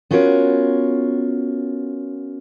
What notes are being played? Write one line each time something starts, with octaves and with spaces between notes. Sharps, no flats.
B3 C#4 F4 F#4 A#4 C#5